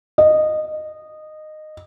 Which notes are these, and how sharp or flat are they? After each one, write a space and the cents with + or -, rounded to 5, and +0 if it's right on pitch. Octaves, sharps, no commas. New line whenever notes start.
D#5 -15